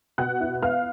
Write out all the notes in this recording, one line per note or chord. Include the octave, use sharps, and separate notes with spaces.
B2 F#5 F#6
E4
B3 F5 F6